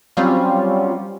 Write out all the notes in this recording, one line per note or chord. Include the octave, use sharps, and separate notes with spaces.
F#3 G3 C4 C#4 F4